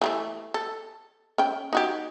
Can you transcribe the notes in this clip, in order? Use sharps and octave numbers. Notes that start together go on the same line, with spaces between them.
E3 F#3 A3
A4
C#4 G5
D#4 F#4 G4